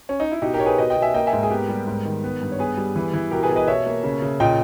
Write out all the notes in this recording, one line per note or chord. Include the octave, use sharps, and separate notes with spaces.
C#4
D#4
E4
B2 D#4 G4
G4 A#4
B2 C#5
G#4 B4
B2 B4 D#5
D#5 G5
B2
E5 G#5
A#3 D#5 G5
E5 G#5
G#2
G#4
B3 G4 A#4
G3
G#2
D#3
B3
G2
C#5
B3 G#4 B4
G3
E3
E3
B2 G4 A#4
G#4 B4
B2
B4 D#5
B2 C#5 E5
A#3
C#3
C#3
A#2 D#5 G5